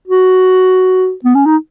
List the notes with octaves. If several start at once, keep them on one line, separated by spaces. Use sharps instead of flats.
F#4
B3
C#4
D#4